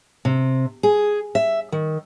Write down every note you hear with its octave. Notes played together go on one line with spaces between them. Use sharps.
C3
G#4
E5
D#3